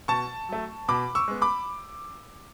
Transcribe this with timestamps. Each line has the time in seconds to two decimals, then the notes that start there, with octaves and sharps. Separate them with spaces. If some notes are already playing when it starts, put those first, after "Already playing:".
0.08 B2 A5 C#6
0.49 F#3 A3
0.88 B2 B5 D6
1.15 C#6 E6
1.28 G#3 B3
1.42 B5 D6